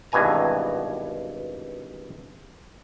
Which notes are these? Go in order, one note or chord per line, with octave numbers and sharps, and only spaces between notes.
G#1 G2 B2 E3 G#5 A#5